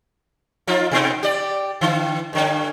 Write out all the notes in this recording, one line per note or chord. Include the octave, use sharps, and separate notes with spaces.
F3 D#4 F4
B2 B3 D#4
G4 D5
D3 E3
G2 D3 C#4